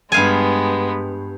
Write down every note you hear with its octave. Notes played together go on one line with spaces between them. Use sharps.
G2 G#3 B3 F5 G#5